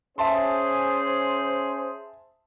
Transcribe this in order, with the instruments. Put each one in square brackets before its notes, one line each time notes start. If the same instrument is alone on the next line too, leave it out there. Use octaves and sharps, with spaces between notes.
[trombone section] C#4 G#4 C5 [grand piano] E5 A5 C6